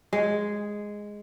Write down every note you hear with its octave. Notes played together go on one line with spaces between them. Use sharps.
G#3